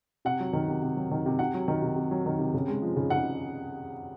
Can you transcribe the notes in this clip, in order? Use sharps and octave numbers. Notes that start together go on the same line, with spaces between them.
C3 F#5
F#3
D#3
C3
C3
F#3
D#3
C3
C3 F#5
F#3
D#3
C3
C3
F#3
D#3
C3
C#3
G#3
F3
C#3
C#3 F#5